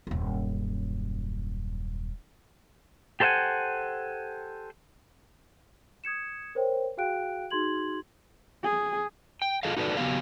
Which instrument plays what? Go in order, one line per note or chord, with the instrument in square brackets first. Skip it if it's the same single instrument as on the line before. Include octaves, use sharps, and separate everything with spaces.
[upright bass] D#1 F#2
[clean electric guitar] G4 A4 C5 E5 F#5 G#5
[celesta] D#6 G#6 C#7 E7
A#4 C5 C#5 G5
F#4 G#4 F5 G5 F#6 D7
D#4 F#4 G#4 C6 G#6 F#7
[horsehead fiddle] G#4
[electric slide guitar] G5
F4 G#4 A4 D#5 F5
D#4 F#4 A4 B4 D5
C#3 F#3 B3 G4 F5